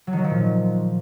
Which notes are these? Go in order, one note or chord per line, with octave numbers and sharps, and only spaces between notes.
F#3
D#3
F#3
F3
A#2